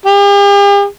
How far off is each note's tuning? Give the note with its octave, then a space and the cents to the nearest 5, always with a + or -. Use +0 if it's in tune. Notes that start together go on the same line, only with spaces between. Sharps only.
G4 +45